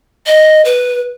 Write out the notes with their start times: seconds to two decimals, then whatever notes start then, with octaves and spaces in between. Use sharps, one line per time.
0.27 D#5
0.65 B4